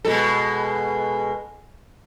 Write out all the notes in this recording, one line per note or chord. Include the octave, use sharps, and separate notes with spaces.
B2 G#3 A4